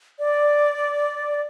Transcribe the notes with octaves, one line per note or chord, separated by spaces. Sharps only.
D5